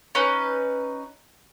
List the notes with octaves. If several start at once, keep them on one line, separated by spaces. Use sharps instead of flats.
C#4 D#4 B4